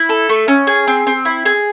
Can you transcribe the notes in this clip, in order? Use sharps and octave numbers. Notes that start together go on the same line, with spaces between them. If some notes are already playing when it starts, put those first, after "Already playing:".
Already playing: E4
A4
A3
C#4
G#4
C4
C4
E4
G#4